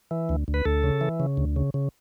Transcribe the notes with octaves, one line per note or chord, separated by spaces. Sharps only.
E3
D2
D2
B4
D2 A4
C#3
E3
C#3
D2
C#3
C#3